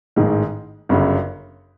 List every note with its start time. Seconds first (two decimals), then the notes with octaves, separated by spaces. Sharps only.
0.16 A1 G#2 D#3 G#3
0.89 G1 F#2 C#3